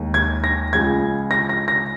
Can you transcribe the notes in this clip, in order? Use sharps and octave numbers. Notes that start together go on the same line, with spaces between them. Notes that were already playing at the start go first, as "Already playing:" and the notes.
Already playing: D#2 D#3 G#3
G#6
A#6
C#2 C#3 F3 G#6
A#6
A#6
A#6